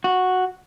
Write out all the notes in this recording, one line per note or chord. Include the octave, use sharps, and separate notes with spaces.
F#4